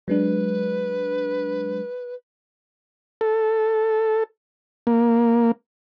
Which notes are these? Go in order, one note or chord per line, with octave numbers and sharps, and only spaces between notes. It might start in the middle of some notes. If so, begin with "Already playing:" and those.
F#3 G#3 D4 B4
A4
A#3